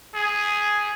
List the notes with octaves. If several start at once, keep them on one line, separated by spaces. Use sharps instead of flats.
G#4